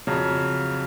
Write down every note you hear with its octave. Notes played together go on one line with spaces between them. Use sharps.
F2 C#3 F#3